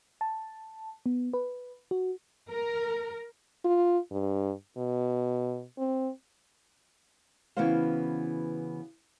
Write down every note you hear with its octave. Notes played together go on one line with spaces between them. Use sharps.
A5
B3
B4
F#4
A#4
F4
G2
B2
C4
C#3 E3 B3 F#4 C5 F5